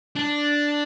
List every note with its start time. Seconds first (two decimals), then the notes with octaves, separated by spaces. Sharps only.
0.16 D4